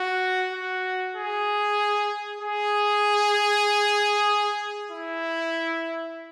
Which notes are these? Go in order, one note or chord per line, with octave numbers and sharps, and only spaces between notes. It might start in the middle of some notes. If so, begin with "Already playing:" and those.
Already playing: F#4
F#4
G#4
G#4
E4